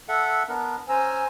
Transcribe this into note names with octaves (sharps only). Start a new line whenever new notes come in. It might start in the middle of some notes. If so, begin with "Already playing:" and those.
A4 E5 F#5
B3 D4 A#4
C#4 C5 G#5 A#5 E6